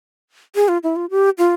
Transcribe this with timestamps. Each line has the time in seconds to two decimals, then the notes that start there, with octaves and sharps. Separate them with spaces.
0.55 G#4
0.68 F4
0.83 E4
0.96 F4
1.11 G4
1.38 F4